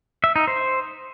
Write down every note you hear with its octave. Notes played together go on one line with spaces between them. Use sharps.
E5
D#4
C5